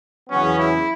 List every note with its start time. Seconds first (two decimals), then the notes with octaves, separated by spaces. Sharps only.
0.29 E2 C#3 F#3 B3 C#4
0.59 E4